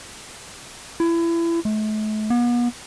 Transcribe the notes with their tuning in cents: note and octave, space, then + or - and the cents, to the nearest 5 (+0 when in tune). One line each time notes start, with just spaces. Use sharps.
E4 +30
A3 -40
B3 -40